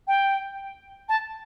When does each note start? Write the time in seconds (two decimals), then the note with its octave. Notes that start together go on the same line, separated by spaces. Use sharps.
0.08 G5
1.09 A5